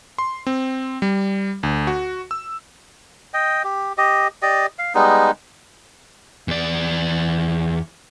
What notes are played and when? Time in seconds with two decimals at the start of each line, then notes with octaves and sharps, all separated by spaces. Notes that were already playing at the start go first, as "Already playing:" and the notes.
0.18 C6
0.47 C4
1.02 G3
1.63 D2
1.87 F#4
2.31 E6
3.34 D#5 G5
3.64 G4
3.98 G4 D#5
4.42 G4 D5 D#5
4.79 F5
4.95 G3 G#3 B3 D#4
6.48 E2 D5